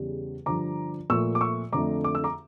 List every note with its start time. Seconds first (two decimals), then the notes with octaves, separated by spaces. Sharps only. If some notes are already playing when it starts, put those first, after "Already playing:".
Already playing: E2 C#3 G3
0.46 G2 D3 F3 A#5 D6
1.10 A#2 F3 A3 C#6 E6
1.35 D6
1.41 C#6 E6
1.72 F2 D3 A3 A#5 D6
2.04 D6
2.15 E6
2.24 A#5 D6